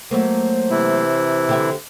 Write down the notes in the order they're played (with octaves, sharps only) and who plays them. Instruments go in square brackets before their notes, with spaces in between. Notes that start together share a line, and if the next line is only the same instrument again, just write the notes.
[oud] F#3 A3 A#3 [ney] C5
[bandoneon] C3 E3 E4
[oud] D3 G4 E5